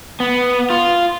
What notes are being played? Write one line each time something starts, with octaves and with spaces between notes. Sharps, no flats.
B3
F4